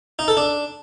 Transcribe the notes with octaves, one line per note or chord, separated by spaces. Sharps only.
D#4
A4
D4